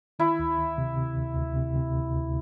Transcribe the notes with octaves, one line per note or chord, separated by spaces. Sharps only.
D#3 E4
D2
D2
C3
C3
D2
D2
C3
C3
D2
D2